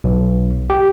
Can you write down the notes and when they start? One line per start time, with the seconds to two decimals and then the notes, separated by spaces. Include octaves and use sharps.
0.04 B1
0.70 G4